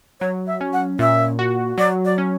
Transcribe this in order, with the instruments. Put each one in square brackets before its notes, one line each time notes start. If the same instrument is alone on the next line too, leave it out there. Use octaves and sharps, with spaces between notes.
[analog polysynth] F#3 [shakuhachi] C#5
[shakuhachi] E5
[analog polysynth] C#4
[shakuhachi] F#5
[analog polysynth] A#2 [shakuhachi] E5
[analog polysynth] F#4
[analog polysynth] F#3 [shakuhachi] D5
[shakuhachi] D5
[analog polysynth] C#4